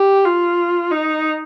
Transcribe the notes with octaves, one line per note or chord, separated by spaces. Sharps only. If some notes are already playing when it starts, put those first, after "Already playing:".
Already playing: G4
F4
D#4